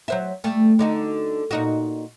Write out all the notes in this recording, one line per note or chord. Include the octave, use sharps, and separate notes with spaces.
F#3 C5 E5
G3 A3
D3 D#4 F#4
A#2 D#4 F#4